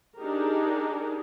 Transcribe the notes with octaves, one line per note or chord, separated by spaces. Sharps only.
D4 D#4 G4 G#4 A#4